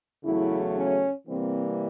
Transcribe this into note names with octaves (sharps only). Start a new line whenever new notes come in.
E2 C#3 F#3 A3 E4
C#4
C3 E3 G3 A#3 C4